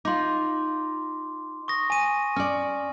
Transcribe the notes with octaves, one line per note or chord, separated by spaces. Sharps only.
D#4 F4 C6 D6
C#6 D#6 A#6
G#5 D#7
C#4 D5 F6